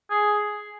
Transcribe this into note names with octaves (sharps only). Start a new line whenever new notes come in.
G#4